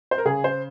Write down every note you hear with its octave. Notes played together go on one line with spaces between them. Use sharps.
C5
A#4
C#3 G#4
C5